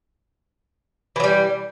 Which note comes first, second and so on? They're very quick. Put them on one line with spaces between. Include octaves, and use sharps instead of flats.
E3 F#3 G3